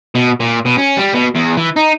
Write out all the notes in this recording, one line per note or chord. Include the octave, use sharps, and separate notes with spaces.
B2
A#2
B2
C#4
G3
B2
E2
E3
D#4